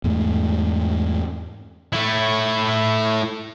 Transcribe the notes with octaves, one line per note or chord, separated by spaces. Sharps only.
E2 G#2 A3
A3 E4